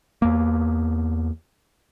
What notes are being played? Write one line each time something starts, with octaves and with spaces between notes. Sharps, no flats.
E2 A#3